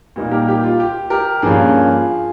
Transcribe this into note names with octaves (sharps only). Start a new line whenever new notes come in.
A#2 G3 A#3 D#4
G4 A#4
G4
F4
G4
G4 A#4
G2 F3 A#3 C#4 F4 G#4